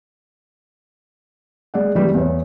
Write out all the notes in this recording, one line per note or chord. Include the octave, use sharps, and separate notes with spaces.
G#3 D5 F#5
C3 E3 G3 A3
E2 C#5